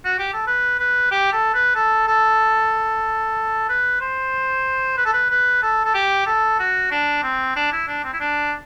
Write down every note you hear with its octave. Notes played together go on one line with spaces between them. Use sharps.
F#4
G4
A4
B4
B4
G4
A4
B4
A4
A4
B4
C5
B4
A4
B4
B4
A4
A4
G4
A4
F#4
D4
C4
D4
E4
D4
C4
E4
D4